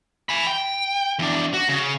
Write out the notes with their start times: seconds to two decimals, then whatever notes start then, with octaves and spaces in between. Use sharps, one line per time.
0.29 G#5 B5
0.47 G5
1.19 E2 D4
1.54 F#4
1.69 C#3